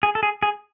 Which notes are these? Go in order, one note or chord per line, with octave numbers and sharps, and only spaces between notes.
G#4
A4
G#4
G#4